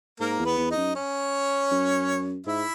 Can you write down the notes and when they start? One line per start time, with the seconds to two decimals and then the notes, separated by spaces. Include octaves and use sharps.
0.20 G#2 A#3 A#4
0.39 E2
0.45 B3 B4
0.58 E2
0.71 D#4 D#5
0.77 F#2
0.95 C#4 C#5
1.71 F#2
2.46 G#2 E4 E5